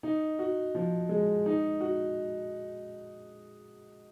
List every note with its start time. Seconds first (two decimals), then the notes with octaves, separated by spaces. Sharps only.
0.03 D#4
0.39 F#4
0.75 F3
1.09 G#3
1.46 D#4
1.81 F#4